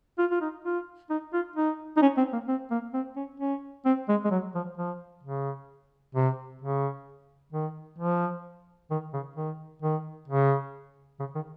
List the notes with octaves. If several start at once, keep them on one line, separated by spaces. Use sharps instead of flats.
F4
F4
D#4
F4
D#4
F4
D#4
D#4
C#4
C4
A#3
C4
A#3
C4
C#4
C#4
C4
G#3
G#3
F#3
F3
F3
C#3
C3
C#3
D#3
F3
D#3
C#3
D#3
D#3
C#3
C#3
D#3